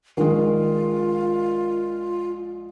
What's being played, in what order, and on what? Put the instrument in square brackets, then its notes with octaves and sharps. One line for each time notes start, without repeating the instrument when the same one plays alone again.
[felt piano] A#1 G#3 [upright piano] D#3 [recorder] F4